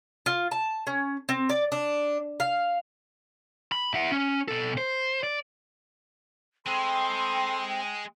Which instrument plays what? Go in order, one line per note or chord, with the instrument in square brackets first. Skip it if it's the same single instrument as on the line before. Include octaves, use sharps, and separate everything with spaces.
[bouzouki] F4
A5
C#4
C4
D5
D4
F5
[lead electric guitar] B5
E4 F#5
C#4
B2 A4
C5
D5
[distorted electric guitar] G#3 [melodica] C4 [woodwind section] A4 B5 C6 [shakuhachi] G5